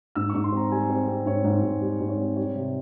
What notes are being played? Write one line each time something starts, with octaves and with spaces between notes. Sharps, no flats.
G#2 E6
G#2 C#6
C6
C4 A#5
G3 G#5
C4
C4
G#2 C#5
G#2
G#2
G3
G#2
C#5
C4
G3 C#5
C3